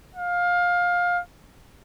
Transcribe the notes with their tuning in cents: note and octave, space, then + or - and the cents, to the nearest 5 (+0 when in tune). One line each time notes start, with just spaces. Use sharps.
F5 +20